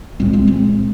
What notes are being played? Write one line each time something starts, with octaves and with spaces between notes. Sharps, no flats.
C2 A#2 G#3 C4
G#3 C4
G#3 C4